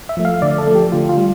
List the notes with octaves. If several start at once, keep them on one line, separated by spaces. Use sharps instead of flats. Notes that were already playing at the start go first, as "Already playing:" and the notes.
E5
F3 A3
F5
D3 D5
A4
F3 A3
G4
D3 F4
F4
G3